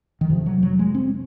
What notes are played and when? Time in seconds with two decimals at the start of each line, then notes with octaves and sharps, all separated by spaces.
0.21 D#3
0.30 F2 C3 F3
0.46 F#3
0.63 F#3
0.79 G#3
0.95 C4